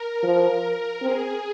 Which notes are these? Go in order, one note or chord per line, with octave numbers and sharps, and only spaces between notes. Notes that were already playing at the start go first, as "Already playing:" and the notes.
Already playing: A#4
F3
C4 G#4